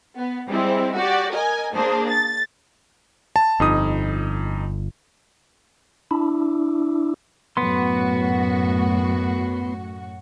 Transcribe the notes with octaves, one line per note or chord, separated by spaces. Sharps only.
B3
G3 G#3 C4 E4
F#4 G4 D5
A#4 D#5 G#5
A#3 D4 G#4 C5
A6
A5
G1 F2 D#4 D#6
D4 E4
F#2 A2 B3 F#4 C6